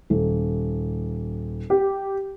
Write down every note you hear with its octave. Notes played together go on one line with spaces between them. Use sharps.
D#1
G4